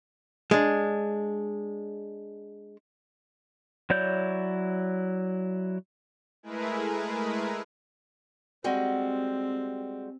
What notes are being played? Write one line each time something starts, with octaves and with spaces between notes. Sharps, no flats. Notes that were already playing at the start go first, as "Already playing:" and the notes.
G#3 D4
F#3 E4 C#5 D5 G6
G#3 A3 E4 G#4 A#4 B4
G3 G#3 C4 F#4